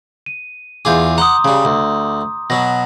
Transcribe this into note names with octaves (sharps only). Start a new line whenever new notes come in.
D#7
E2 F4 G#4 D6 G6
F#5 A#5 C6 D#6
C#3 G3
D2
B2 F#3 A#6